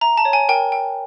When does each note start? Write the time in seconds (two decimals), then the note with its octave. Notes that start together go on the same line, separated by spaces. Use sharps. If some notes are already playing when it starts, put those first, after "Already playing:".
0.01 E5 A#5
0.17 A5
0.25 C#5
0.33 G#5
0.49 A#4 G5
0.72 G5